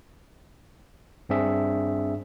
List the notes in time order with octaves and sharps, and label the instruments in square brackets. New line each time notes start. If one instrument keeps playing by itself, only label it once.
[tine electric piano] G2 C4 D4 G#4 E5